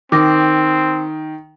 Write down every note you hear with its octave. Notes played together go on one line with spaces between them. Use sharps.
D#3 C4 D6 A#6